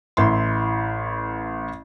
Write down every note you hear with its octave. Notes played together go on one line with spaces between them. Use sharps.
A1 E4 C6